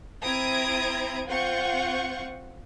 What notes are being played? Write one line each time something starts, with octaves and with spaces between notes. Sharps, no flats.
C4 E4 A#5 D#6 G#6 D7
C4 F4 F#5 C#6 G6